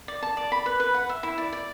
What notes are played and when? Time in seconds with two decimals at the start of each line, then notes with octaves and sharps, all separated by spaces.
0.08 D5
0.22 A5
0.37 D5
0.52 B5
0.66 B4
0.80 B4
0.94 F#5
1.09 E5
1.23 E4
1.38 D5
1.53 D5